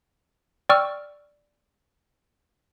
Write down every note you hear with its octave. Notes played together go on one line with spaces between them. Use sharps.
D5 G5 C#6 E6 F6